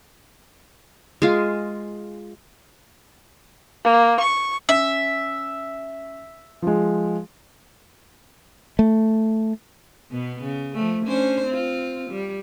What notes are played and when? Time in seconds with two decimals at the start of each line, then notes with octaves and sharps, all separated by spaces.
1.22 G#3 F4
3.84 A#3
4.20 C#6
4.69 C#4 E5
6.62 F3 G#3
8.79 A3
10.11 B2 B3
10.42 C#3
10.74 F3 A3
11.06 C#4 D4 C5
11.46 C4 F4
12.10 G3